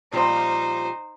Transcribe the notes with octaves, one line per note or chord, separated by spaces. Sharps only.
A#2 F3 G3 D#4 C5